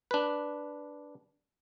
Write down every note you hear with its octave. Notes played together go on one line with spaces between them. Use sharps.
D4 B4